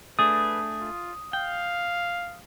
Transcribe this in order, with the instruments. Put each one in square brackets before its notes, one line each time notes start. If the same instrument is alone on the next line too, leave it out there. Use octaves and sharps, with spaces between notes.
[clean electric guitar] A3 D4 G#4 [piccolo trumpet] B4 [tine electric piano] D#6
[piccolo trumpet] F4
[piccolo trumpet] F5 [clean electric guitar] G5